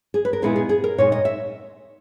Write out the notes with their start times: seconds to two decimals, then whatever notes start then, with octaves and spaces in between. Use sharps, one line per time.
0.14 G#4
0.25 B4
0.33 A#4
0.42 A#2 G#3 B3 E4 G#4
0.56 G#4
0.69 G#4
0.84 A#4
0.98 A#2 G#3 D#4 C#5
1.12 D#5
1.25 E5